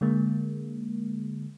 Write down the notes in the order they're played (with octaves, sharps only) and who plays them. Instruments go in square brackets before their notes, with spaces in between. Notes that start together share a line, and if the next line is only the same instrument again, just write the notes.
[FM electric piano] D3 G#3 A#3